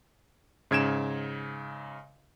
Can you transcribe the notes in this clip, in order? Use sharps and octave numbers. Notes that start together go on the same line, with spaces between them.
G#2 C#3 G#6 D7 E7